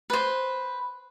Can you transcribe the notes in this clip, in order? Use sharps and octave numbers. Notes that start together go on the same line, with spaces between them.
B4 C5